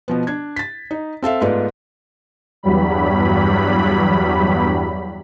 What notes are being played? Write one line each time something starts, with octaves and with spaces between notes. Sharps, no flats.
B2 F3 B3
D4 G#6
A6 B6
D#4
C4 A4 E5 F5
G#2 A3 B3 F4 B4 D5
E2 G2 F#3 G3 B5